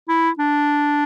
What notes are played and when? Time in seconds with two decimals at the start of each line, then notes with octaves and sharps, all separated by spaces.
0.09 E4
0.39 D4